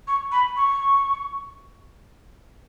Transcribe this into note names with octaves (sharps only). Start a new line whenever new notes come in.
C#6
B5
C#6